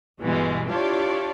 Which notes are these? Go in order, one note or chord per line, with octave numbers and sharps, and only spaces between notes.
G1 B2 E3 G3 G#3
D4 E4 F4 G4 C#5 D5